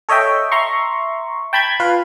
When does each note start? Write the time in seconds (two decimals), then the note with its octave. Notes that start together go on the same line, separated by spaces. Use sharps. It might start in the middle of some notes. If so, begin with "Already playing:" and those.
0.09 A4 C#5 D#5 E5 G5
0.52 E5 A#5 C6 C#6
1.53 G5 A5 B5 G6 G#6
1.80 F4 B4 F5